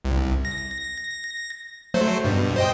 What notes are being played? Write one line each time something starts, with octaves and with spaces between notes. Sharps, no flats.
C2
A#6
F#3 A3 C5
G2 B2
C5 D#5 G5